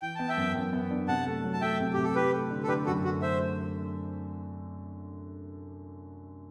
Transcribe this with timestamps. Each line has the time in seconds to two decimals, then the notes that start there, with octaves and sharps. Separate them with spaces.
0.02 E3 G5
0.15 B3 A5
0.28 E5 G5
0.37 F#2
0.55 F#2
0.73 B3
0.91 D4
1.08 C3 F#5 A5
1.26 A3
1.44 F#3
1.53 A5
1.62 A3 E5 G5
1.80 C3
1.93 C3 G4
2.04 A4
2.15 E4 G4 B4
2.33 A3
2.51 D3
2.63 A4
2.68 D3 G4 B4
2.86 F#2 F#4 A4
3.04 A3 F#4
3.22 C5 E5